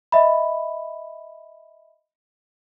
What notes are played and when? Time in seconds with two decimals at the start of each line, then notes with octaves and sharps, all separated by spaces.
0.12 D#5 E5 B5